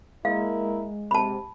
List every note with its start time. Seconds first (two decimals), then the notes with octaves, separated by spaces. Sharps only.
0.25 G#3 A#3 E4 A#4 F5
1.11 C3 A5 B5